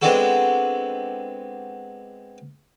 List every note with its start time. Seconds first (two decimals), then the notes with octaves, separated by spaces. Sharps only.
0.02 G#3 B3 C4 D4 F#4 A4